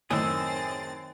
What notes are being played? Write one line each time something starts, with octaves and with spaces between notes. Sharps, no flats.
F#2 A2 D#3 C4 G#4 E6 A6